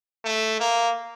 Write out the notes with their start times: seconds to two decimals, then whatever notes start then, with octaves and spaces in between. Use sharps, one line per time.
0.25 A3
0.60 A#3